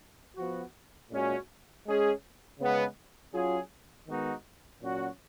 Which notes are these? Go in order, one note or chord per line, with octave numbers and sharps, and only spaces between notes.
F3 B3 F#4
A#2 G#3 C#4 F#4
G#3 C#4 G#4
C#3 G#3 B3
F#3 C#4 F4 G#4
D#3 G#3 B3 D#4 F#4
A#2 F#3 C#4 F#4